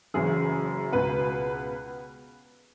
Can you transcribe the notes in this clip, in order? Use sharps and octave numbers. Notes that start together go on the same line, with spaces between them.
F#1 F#2 E3 G#4
C#2 B2 B3 B4